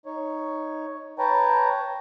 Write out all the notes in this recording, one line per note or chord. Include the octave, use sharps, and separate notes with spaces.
D#4 C#5
B4 C#5 G5 A5 A#5